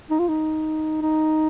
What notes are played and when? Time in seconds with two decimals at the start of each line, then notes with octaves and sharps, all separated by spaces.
0.10 D#4
0.19 F4
0.29 D#4
1.02 D#4